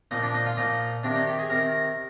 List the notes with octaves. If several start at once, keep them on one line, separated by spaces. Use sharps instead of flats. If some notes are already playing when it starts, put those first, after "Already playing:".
A#2 F3 D#4
D4
D#4
F4
A#2 F3 D#4
C3 D#3 D4
D#4
G4
G#4
C3 D#3 A#4